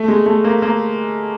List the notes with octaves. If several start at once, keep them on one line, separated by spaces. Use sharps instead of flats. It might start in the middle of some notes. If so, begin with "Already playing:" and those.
Already playing: A3
G#3
A3
A#3
A#3